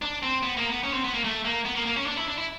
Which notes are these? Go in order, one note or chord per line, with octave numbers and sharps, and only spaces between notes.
D4
C4
B3
A#3
B3
C#4
C4
B3
A#3
A3
A#3
B3
A#3
A#3
C#4
D4
E4
D4
E4